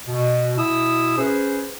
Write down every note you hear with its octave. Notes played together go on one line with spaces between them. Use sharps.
B2
B2 E4 D#6 E6
C#4 G#4 B4 C5